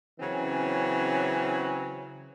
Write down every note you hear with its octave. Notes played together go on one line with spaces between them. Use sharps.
C#3 E3 F#3 C4 C#4